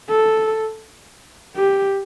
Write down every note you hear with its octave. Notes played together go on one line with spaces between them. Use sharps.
A4
G4